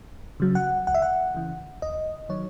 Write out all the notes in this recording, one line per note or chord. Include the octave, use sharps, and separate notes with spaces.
C#3 F#3
F#5
C#2 F#5
E5
F#5
C#3 E3
D#2 D#5
D#3 F#3 C#5